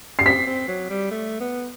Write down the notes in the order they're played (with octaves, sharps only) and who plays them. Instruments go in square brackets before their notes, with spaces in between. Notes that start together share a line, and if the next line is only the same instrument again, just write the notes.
[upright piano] C7
[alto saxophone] C4 [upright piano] B6
[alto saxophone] C4
F#3
G3
A3
B3